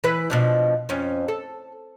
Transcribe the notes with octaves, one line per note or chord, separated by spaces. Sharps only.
E3 B4
B2 F3 D4
F2 C#4
A4